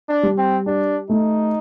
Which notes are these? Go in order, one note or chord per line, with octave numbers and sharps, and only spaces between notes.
D4
G3
C4
D4 G4
A3 D#4